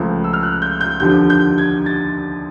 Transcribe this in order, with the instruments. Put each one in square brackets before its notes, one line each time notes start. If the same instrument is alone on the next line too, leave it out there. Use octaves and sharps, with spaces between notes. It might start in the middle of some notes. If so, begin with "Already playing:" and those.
Already playing: [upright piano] C#2 C#3 F3 A3
E6
F6
F#6
G6
G6
D#2 D3 F3 G6
G6
G#6
A6